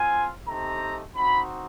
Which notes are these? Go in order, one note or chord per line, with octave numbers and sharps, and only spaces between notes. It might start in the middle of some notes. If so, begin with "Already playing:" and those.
Already playing: C4 F4 G#5
A3 C4 D#4 G4 A#5
C4 D#4 F#4 B5